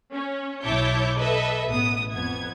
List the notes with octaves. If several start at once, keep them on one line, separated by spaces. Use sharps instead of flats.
C#4
B1 E4 C#5 A5 D6 G6
A4 B4 D#5 E5
A1 B3 D#6
F2 B3 G#6